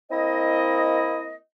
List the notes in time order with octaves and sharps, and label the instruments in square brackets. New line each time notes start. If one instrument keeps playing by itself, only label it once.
[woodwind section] A#3 C4 E4 D#5